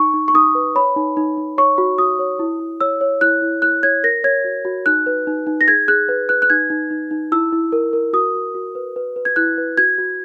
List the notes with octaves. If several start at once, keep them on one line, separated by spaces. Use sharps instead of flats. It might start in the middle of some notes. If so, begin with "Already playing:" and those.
Already playing: D#4 C#6
D#4
C#6
D#4 D#6
B4
C#5 B5
D#4
D#4
D#4
C#5 C#6
F#4
F#4 D#6
C#5
E4
E4
C#5 E6
C#5
E4 F#6
E4
E4 F#6
C#5 G#6
A#4 A#6
C#5 G#6
F#4
F#4
D#4 F#6
B4
D#4
D#4
A#6
G#4 G#6
G#4 F#6
B4
B4 F#6
F#6
D#4 G#6
D#4
D#4
D#4
E4 E6
E4
A#4
A#4
F#4 D#6
F#4
F#4
B4
B4
B4
G#6
E4 F#6
B4
F#4 G#6
F#4